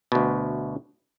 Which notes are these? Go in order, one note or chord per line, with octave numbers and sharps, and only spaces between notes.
D2 B2